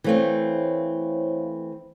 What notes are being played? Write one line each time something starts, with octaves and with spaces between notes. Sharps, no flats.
E3 A3 C4 C5 C#5 F5